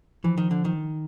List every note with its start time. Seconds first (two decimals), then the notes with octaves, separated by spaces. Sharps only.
0.24 E3 F3
0.38 D#3
0.51 D3
0.65 D#3